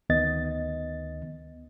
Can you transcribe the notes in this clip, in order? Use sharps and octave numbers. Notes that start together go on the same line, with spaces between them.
D2 D#3 B3 D#5 A6